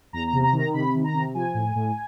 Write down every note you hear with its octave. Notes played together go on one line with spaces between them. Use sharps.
E2 A#5
A#5
C3
A#5
D#3
A#5
C3 B5
D#3
A#5
C3
F3 G#5
A2
A2